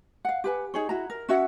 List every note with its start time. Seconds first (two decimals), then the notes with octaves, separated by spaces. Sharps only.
0.25 F5 F#5
0.44 G4 B4 G#5
0.74 D#4 G#4 C#5
0.89 E4 F#4 A#5
1.10 A#4
1.29 C#4 F#4 E5 F#5